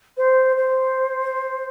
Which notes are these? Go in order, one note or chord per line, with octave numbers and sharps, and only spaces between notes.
C5
C5